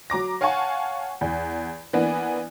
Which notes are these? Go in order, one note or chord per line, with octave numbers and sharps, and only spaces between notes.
F#3 A#5 D6 A#6
C#5 F5 F#5 G#5 A5 C#6
E2
E3 A#3 B3 D4